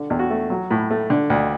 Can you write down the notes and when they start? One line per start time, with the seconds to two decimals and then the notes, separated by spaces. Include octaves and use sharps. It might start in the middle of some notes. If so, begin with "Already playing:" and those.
Already playing: D3
0.10 E2
0.19 F#4
0.31 A3
0.50 F#3
0.71 A2
0.91 A3
1.10 D3
1.30 D2